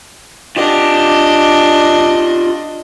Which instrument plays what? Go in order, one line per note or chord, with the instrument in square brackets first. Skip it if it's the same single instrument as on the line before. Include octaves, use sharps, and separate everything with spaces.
[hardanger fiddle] D4 D#5 [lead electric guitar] F4 G4